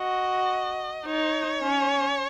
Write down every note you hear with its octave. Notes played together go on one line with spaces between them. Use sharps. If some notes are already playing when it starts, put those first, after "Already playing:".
Already playing: F#4 D#5
D#4 C#5
C#4